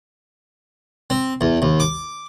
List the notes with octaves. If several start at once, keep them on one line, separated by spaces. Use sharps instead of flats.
C4
E2
D#2
D6